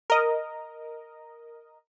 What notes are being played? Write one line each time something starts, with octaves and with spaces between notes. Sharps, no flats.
A#4 D#5